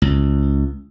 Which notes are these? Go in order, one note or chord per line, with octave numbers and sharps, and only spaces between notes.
C#2